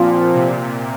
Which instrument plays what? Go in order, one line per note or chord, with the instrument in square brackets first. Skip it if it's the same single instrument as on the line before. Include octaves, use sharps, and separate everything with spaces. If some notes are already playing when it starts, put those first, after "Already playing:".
Already playing: [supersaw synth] A#2 [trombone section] F3 C4 F4
[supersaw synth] C3